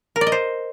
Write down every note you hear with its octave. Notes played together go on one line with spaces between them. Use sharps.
A#4
D5
D#5
C5